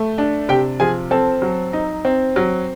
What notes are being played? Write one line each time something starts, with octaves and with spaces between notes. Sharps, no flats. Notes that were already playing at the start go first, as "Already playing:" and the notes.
Already playing: A3
D4
C3 G4 G5
F3 G#4 G#5
C4 A4 A5
F#3
D#4
C4
F#3